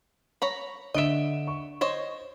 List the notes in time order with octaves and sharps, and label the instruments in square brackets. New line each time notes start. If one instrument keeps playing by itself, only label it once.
[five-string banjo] C#5 A#5 B5
[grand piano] D3 D7 E7 [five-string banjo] D#5 E5
[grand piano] C#6
[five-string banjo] C5 C#5 D#5